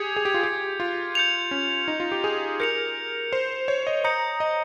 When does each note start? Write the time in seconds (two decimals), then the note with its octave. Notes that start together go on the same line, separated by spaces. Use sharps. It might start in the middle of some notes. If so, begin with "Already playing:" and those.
Already playing: G4 G#4 G#6 C#7 F7
0.16 G#4
0.25 G4
0.34 F4
0.43 G4
0.80 F4
1.15 G6 C#7 F7
1.51 C#4
1.88 D#4
2.00 F4
2.12 G4
2.24 G#4
2.60 A#4 G6 C#7 F7
3.33 C5
3.68 C#5
3.87 D#5
4.04 A#5 D#6 G6 C#7
4.40 D#5